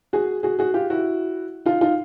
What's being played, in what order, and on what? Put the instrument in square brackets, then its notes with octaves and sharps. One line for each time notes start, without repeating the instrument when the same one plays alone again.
[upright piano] F#4 G#4
F#4 G#4
F#4 G#4
F4 G4
E4 F#4
D#4 F4
D#4 F4